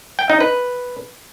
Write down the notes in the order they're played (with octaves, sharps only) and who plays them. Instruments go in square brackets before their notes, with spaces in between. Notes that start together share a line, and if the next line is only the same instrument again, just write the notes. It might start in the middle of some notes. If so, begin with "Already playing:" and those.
[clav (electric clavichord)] G5
D#4
B4